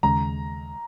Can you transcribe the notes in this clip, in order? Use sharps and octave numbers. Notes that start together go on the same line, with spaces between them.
D#2 C#3 G#3 A#5